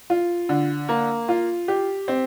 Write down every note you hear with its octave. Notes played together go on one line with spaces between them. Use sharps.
F4
D3
A#3
F4
G4
C4